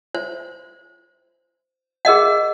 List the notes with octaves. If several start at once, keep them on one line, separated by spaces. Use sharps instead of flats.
C5
G#4 A#4 D#5 F#5